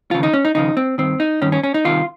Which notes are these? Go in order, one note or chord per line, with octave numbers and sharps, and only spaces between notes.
D#2 C#3 F3 F4
D#4
C#4
D#4
D#2 C#3 F3 D#4
C4
G2 D#3 C4
D#4
G2 D#3 C#4
C#4
C#4
D#4
C2 C3 D#3 F4